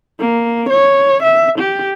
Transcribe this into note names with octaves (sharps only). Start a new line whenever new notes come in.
A#3
C#5
E5
G4